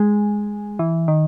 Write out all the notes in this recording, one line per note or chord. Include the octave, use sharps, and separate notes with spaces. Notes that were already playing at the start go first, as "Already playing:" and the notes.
Already playing: G#3
E3
D#3